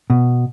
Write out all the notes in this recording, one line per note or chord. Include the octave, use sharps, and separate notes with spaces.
B2